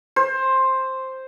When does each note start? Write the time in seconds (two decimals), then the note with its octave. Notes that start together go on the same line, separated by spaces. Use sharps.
0.16 C5